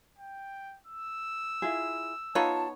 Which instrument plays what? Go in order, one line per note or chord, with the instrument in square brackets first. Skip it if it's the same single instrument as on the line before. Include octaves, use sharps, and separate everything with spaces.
[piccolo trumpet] G5
E6
[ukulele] E4 F4 G#4
[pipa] B3 D#4 C#5 [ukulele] F4 [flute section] A5